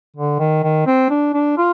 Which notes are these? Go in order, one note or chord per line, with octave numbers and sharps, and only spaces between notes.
D3
D#3
D#3
C4
D4
D4
F4